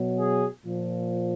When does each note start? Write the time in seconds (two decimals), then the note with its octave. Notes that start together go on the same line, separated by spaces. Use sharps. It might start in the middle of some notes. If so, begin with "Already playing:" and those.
Already playing: B2 F#3
0.17 G#4
0.65 A#2 F3